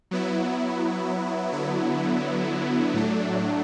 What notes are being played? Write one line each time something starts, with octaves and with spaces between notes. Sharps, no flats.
F#3 B3 E4
D3 F#3 B3 E4
A2 F#3 A3 D4